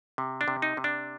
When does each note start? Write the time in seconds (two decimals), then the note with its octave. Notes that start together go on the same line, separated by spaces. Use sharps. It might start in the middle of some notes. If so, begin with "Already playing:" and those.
0.18 C3
0.41 D4
0.48 C3
0.62 D#4
0.77 C3
0.84 D4